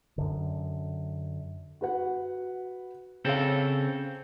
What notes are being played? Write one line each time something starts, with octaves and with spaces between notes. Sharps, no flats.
F#2 D3
F#4 B4 F#5
C#3 C4 G#4 A4 C#5 F5